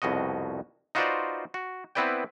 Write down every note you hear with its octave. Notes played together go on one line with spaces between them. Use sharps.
C2 F2 B2 F#4 D#5
D#4 F4 F#4 B4 C5 D5
F#4
B3 C4 E4 B4 D5 G5